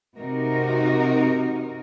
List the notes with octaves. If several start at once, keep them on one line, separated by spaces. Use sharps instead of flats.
C3 D#4 F#4 A#4